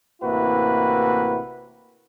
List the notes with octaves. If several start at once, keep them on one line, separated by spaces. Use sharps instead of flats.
A1 C3 A#3 E4 F#4 B4